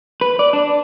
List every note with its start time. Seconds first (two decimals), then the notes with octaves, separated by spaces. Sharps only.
0.21 B4
0.39 D5
0.53 D4